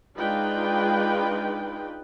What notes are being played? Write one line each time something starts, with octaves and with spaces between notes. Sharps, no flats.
G#3 D4 D#4 F4 B4 G5